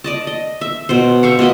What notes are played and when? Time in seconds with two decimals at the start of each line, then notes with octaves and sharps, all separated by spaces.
0.04 D5 D#5 A5
0.27 D#5
0.61 E5
0.89 B2 B3 C5
1.23 C5 E5 F5 C#6
1.39 B2 A#3 D#5 B5